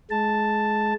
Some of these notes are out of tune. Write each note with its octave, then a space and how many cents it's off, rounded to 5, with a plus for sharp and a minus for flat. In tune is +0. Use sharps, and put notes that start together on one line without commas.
G#3 +25 A5 +0